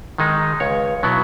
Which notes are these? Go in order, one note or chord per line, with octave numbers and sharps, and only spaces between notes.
D#3 G#3 D#4
C#2 C#5
B2 F#3 B3 E4